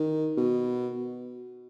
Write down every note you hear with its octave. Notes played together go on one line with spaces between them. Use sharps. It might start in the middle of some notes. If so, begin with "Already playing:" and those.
Already playing: D#3
B2